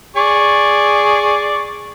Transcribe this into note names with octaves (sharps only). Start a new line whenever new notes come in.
G#4 D5 C#6